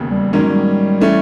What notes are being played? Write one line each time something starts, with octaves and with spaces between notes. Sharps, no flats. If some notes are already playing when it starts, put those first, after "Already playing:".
Already playing: E1 D#2 C#3
G3
G#2 D#3 F#3 G3 A#3 C#4
G#3
G3
E3 A3 C#4